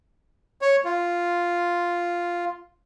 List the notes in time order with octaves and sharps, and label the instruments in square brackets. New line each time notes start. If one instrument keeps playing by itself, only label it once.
[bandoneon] C#5
F4